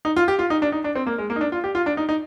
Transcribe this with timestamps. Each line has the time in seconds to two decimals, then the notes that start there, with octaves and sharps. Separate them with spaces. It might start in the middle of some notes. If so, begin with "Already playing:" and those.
0.05 D#4
0.16 F4
0.28 G4
0.39 F4
0.50 D#4
0.62 D4
0.72 D#4
0.84 D4
0.95 C4
1.07 A#3
1.18 G#3
1.30 A#3
1.36 D#4
1.41 D4
1.52 F4
1.64 G4
1.75 F4
1.86 D4
1.97 D#4
2.09 D#4